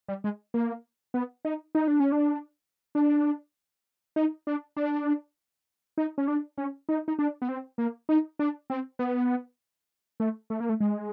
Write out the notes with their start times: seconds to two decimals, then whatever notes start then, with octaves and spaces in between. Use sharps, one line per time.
0.08 G3
0.24 G#3
0.54 A#3
1.14 B3
1.45 D#4
1.75 D#4
1.88 D4
2.00 C#4
2.12 D4
2.95 D4
4.16 D#4
4.47 D4
4.77 D4
5.98 D#4
6.18 C#4
6.28 D4
6.58 C#4
6.89 D#4
7.08 D#4
7.19 D4
7.42 B3
7.49 C4
7.78 A#3
8.09 D#4
8.39 D4
8.70 C4
8.99 B3
10.20 A3
10.50 A3
10.60 A#3
10.69 A3
10.80 G#3